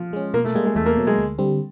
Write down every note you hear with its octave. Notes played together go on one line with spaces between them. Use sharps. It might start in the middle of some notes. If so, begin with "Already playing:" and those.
Already playing: F3
G#3 C#4
B2 A#3
A3
G3 G#3 A#3
G#3
E2 A3
A#3
B2 F#3
G#3
D2
D3 G3 C4